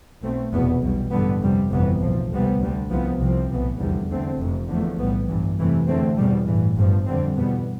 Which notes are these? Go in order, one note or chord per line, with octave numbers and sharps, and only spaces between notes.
B1 B2 A3 C4
F1 E2 B2 B3
B1 B2 G3
A1 G2 D3 G3 B3
F2 C3 G3
G1 F2 C3 E3 B3
B1 A2 F3
D2 C3 G3 B3
D2 D3 G3
C2 C3 F3 B3
C2 C3 F3 C4
B1 A2 E3 B3
F1 E2 D3 G3
E2 D3 A3 C4
F1 F2 C3
E2 D3 F3 A3
B1 A2 G3 B3
G1 G2 E3
F2 C3 E3 A3
E2 D3 A3 C4
E2 B2 G3
A1 G2 E3
G1 G2 F3
F2 D3 G3 C4
E2 B2 G3 B3